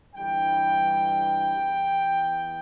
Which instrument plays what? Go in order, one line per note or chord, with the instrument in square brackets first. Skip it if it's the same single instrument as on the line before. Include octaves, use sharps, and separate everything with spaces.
[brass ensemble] G1 G2 E3 G3 G5
E2 E3 B3